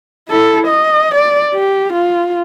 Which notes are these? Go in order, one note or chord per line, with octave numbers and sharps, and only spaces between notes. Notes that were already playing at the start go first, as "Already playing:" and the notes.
E4 A4
D#5
D5
G4
F4